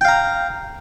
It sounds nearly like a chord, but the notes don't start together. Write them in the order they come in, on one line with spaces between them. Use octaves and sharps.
G5 F5 A#5